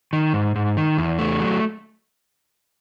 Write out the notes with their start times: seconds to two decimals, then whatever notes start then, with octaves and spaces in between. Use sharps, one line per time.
0.13 D#3
0.33 G#2
0.56 G#2
0.77 D#3
0.98 E2
1.18 A3
1.40 F#3